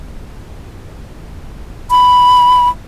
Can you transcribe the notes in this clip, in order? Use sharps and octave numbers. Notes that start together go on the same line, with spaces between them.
B5